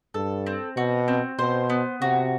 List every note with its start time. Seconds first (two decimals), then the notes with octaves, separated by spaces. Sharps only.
0.14 G2 A4
0.46 C4
0.76 B2 F#4
1.08 C4
1.39 B2 C5
1.70 B3
2.01 C3 F#4